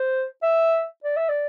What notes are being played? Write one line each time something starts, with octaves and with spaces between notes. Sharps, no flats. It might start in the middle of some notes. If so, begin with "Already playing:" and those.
Already playing: C5
E5
D5
E5
D5